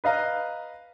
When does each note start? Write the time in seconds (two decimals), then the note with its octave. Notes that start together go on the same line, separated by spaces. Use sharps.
0.04 B4 D#5 F5 A#5